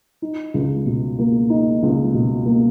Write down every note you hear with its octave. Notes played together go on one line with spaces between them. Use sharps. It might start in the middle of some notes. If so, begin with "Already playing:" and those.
D#4
C#2
B2
A#3
D#4
C#2
B2
A#3